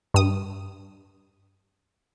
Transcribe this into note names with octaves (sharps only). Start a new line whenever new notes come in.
G2 D#6